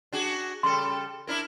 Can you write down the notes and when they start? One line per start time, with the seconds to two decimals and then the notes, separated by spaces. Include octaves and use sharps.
0.13 D4 F#4 G#4
0.63 C#3 G3 A4 C6
1.27 D4 E4 A#4